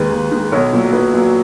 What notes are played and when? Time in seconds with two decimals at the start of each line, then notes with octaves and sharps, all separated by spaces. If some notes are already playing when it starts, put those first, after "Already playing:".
Already playing: D#2 D#3 G#3 B4
0.11 D#2
0.31 D#3 G#3
0.52 B1 C#5
0.73 A#2 F#3
0.93 B1 B4
1.14 A#2 F#3